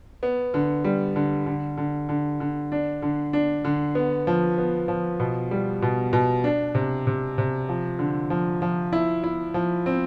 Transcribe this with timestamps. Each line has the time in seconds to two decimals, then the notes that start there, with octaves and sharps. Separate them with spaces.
0.23 B3
0.54 D3
0.84 G3
1.16 D3
1.46 D3
1.77 D3
2.09 D3
2.40 D3
2.72 D4
3.02 D3
3.33 D4
3.65 D3
3.95 B3
4.27 F3
4.58 B3
4.88 F3
5.20 B2
5.51 G3
5.82 B2
6.13 B2
6.44 D4
6.75 C3
7.07 C3
7.38 C3
7.69 F3
7.99 D3
8.30 F3
8.62 F3
8.93 E4
9.23 E4
9.54 F3
9.86 C4